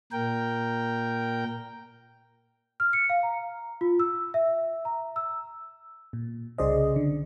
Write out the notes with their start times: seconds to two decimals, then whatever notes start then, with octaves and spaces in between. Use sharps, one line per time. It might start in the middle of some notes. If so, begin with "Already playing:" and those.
0.12 A#2 A#4 G5
2.80 F6
2.93 C#7
3.10 F5
3.23 A#5
3.81 F4
4.00 E6
4.34 E5
4.85 A#5
5.16 E6
6.13 A#2
6.58 C2 C#3 G#4 C5 D5 D#5
6.96 D3